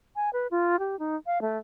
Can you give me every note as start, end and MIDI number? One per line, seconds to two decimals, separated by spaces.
0.16 0.30 80
0.33 0.47 71
0.51 0.79 65
0.79 0.98 67
0.99 1.16 63
1.26 1.41 77
1.41 1.58 57